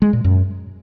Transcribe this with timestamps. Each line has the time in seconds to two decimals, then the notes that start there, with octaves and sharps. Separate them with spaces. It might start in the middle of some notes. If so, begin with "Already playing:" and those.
0.02 G#3
0.13 A#2
0.24 F#2